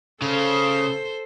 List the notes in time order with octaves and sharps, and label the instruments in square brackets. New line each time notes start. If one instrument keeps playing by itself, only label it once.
[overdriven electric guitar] C#3 [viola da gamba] A4 C5